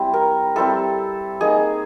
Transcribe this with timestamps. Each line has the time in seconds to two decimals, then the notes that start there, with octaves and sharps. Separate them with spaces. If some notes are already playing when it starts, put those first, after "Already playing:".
Already playing: G3 C4 E4
0.13 A#4
0.56 G3 C4 E4 A4
1.41 A#3 D#4 G#4